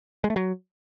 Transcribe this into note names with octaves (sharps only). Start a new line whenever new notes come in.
G#3
A3
F#3